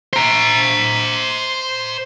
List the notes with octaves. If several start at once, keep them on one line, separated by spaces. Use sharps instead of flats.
C5 A#5